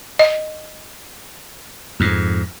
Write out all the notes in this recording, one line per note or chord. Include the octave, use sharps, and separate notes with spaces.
D#5
F2 G#2